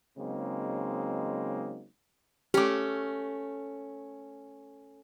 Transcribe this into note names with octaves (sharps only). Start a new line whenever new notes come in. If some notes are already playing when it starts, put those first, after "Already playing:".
C#3 F#3 G#3 A#3 C4 D#4
A3 C#4 G4 D6